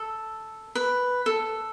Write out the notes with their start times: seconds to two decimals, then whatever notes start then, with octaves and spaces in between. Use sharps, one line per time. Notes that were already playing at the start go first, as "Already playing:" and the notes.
Already playing: A4
0.75 B4
1.26 A4